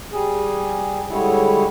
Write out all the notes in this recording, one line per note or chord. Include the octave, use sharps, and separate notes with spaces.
G3 G#4
D3 G3 G#3 E4 C#5